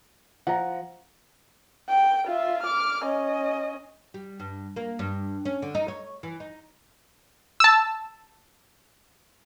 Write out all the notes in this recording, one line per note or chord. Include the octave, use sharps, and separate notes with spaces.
F3 F#5 A#5
G5
F4 E5
D6 F6
C#4 D#5
G3
G2
A#3
G2
C#4
D3
D#4
C#5
E3
D#4
A5 E6